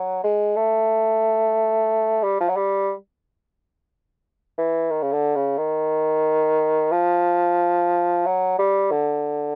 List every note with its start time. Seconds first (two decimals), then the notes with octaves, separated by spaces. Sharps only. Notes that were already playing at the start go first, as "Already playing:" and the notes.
Already playing: F#3
0.24 G#3
0.56 A3
2.23 G3
2.40 F3
2.49 F#3
2.57 G3
4.58 E3
4.91 D#3
5.02 C#3
5.13 D3
5.36 C#3
5.58 D#3
6.92 F3
8.26 F#3
8.59 G3
8.91 D3